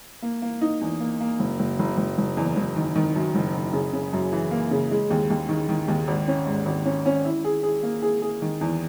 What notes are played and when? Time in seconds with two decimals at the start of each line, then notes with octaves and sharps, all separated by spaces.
0.22 A#3
0.42 A#3
0.61 D#4
0.81 E2
1.00 A#3
1.20 A#3
1.40 F#1
1.59 F#1
1.79 F#1
1.98 F#1
2.18 F#1
2.37 E2
2.57 F#1
2.76 D#3
2.96 D#3
3.16 F#2
3.35 F#1
3.54 F#1
3.73 C#3
3.93 C#3
4.13 F#2
4.32 E3
4.51 A#3
4.71 C#3
4.91 G#3
5.10 D#2
5.30 D#2
5.49 D#3
5.69 D#3
5.88 D#2
6.08 G#1
6.28 C#4
6.46 G#2
6.66 G#1
6.85 C#4
7.06 C#4
7.25 E4
7.45 G#4
7.63 G#4
7.83 A#3
8.02 G#4
8.22 G#4
8.42 D#3
8.61 E2